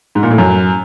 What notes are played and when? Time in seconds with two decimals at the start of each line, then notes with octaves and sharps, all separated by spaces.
0.15 G#2
0.23 A#2
0.31 A2
0.38 F#2